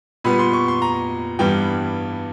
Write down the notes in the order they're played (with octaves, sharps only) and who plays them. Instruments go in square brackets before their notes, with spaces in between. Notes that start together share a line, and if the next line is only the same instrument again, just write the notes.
[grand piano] A#2 G3 B3 B5
C6
C#6
C6
A#5
G2 E3 G3 B3 G5